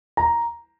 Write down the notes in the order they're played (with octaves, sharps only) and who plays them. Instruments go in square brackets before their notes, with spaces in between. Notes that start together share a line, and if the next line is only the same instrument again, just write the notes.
[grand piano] A#5